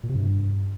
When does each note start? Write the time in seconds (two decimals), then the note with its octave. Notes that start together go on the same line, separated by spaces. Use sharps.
0.03 A#2
0.09 C3
0.15 G2